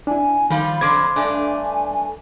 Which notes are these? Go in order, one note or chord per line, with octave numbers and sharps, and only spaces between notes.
D4 E4 G#5
D#3 F3 G3 F4 B5
F2 D3 C5 C6 D6 G#6
G2 A3 D4 G#5